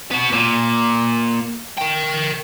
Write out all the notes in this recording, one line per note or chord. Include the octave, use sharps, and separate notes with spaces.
B3 F#4
A#2
A#4 G5